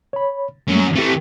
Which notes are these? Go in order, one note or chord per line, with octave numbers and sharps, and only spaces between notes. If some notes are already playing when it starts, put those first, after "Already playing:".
C#5 B5
F#2 F#3 G3 A3 A#3
E3 A3 C4 G4